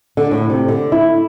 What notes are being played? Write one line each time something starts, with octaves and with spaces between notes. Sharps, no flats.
D3
A2
C3
D3
E4